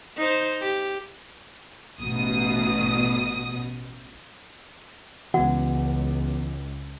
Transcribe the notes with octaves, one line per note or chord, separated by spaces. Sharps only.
D#4 C5
G4
A1 B2 D#6
C#2 E3 B3 F#4 F#5